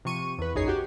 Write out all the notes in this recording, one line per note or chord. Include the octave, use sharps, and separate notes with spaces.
C3 F3 C#6 D#7
E2 B4
A#1 F#2 D#4 G#4 C#5 C7
F#4 G4